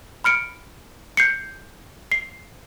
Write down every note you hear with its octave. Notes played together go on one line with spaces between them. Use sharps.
B5 F6 C#7 D7
G6 C7 C#7
C7